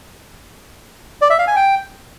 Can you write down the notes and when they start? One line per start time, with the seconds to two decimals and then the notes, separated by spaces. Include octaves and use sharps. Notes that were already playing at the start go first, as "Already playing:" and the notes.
1.22 D5
1.30 E5
1.39 F5
1.47 G#5
1.56 G5